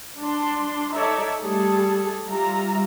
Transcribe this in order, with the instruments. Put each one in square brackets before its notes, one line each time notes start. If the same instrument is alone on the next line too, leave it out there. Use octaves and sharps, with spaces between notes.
[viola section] D4 C6
D#4 A4 C#5 D5 E5
G3 A3 G#4 A4
G3 F4 E5 A#5